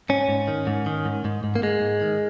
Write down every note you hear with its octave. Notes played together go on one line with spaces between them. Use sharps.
G#2 C#4
G#2
D#3
G#2
D#3
G#2
G#2
G#2
A#3
G#2 G#3
G#2
D#3